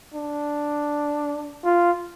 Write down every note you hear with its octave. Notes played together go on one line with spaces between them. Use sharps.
D4
F4